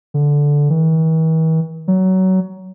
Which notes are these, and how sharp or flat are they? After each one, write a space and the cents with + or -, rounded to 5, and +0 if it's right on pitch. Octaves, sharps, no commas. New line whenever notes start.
D3 -10
E3 -45
F#3 +20